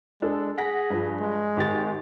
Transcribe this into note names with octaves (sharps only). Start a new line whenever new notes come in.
G#3 D4 A4
G#4 F#5 A#6 B6
G2 F3
G#3
G#1 G4 A6